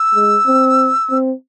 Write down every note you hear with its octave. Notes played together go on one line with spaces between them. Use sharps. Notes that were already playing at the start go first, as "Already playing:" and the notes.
Already playing: E6
G#3
C4
C4